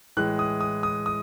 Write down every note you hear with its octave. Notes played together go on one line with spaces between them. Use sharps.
A2 E3 G#3 F#6
D#6
D#6
D#6
D#6